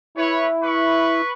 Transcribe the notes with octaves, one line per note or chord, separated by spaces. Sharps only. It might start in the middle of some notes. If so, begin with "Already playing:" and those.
E4 B4 C#5
B4 C#6